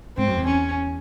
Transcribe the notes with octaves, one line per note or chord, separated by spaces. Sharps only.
G#2 C4
F#2
E2
C#4